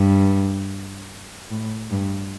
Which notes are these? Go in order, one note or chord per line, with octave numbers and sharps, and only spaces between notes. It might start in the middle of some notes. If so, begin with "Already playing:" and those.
Already playing: G2
A2
G2